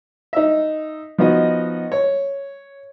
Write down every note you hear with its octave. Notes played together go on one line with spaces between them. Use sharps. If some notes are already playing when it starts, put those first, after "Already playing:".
D#4 E5
F3 B3 D#4 F#4 D#5
C#5